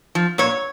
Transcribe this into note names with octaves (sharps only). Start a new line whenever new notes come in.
F3
A#2 C#5